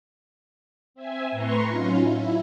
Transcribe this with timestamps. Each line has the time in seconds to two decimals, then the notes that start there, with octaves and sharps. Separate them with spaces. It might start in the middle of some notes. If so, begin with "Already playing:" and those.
0.94 C4 E5 G#5
1.31 A2 B4 A#5 C6 C#6
1.66 F#3 C#4 D#4 F4
1.96 E4